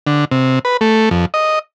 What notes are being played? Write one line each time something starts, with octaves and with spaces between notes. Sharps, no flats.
D3
C3
B4
A3
F2
D#5